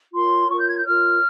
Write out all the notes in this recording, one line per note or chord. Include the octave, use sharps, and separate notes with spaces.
F4 A#4 C#5 C6
F4 A#4 C#5 C#6
G6
G#6
G6
F4 A#4 C#5 F6